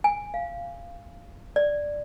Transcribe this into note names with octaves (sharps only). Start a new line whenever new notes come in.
G#5
F5
D5